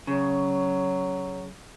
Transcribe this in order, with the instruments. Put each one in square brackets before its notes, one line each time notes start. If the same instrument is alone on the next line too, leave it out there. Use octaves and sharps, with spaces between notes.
[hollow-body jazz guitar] C#3 [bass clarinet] F#3